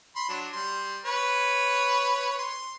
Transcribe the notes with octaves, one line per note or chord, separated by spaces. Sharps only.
B5 C6
F#3 D4
G3 C6
B4 C#5
C6